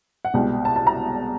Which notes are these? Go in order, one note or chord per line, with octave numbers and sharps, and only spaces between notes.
F#5
C2 B2 G#3 G5
A5
A5
A#5